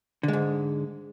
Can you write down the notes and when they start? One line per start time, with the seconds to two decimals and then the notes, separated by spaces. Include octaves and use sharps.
0.23 D3
0.28 G#3
0.33 G#2